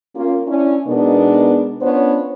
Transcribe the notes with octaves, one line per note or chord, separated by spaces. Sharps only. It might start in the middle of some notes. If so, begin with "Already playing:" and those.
A#3 C#4 F4
C#4 D4 E4
B2 G#3 B3 D4 D#4 A#4
B3 C#4 D4 F4 C5 C#5